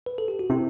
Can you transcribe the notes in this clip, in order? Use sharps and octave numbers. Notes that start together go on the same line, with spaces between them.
B4
A4
G4
F#4
C3 E4